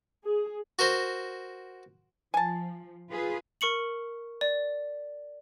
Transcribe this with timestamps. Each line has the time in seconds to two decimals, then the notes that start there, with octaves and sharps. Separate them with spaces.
0.23 G#4
0.79 F#4 A#4 C5
2.34 F3 G#5 A5
3.10 F4 G#4 B4
3.61 A#4 C#6 C#7 F#7
4.41 D5